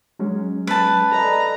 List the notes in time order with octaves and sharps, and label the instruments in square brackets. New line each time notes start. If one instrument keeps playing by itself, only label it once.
[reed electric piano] F#3 G#3 C#4
[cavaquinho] B4 A5
[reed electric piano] A4 D5 D#5 [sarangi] A#5